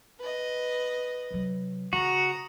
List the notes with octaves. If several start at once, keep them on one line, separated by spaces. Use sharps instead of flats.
B4 D#5
C3 F#3
C#3 F#4 A#5 D#6